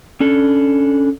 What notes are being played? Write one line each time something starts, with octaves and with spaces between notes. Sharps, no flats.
C#4 D4 A4